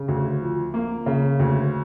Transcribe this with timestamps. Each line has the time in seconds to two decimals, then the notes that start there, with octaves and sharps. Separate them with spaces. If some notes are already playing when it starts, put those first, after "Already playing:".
Already playing: C#3
0.08 D2
0.42 F3
0.74 A#3
1.06 C#3
1.39 D2